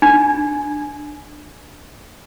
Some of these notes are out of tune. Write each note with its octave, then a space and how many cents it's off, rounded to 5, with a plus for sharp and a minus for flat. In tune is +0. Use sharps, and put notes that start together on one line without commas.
D4 +10